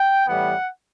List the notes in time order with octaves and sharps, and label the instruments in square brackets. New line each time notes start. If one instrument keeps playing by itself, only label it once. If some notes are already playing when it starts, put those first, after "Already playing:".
Already playing: [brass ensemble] G5
A2 E3 G3 B3 F#5